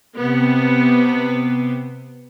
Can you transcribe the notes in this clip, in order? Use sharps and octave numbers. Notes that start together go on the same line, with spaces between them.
C3 B3